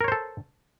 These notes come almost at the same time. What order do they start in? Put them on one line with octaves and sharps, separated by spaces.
A#4 C#5 C5 A4